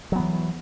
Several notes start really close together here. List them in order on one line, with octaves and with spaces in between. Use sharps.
F#3 B3 E3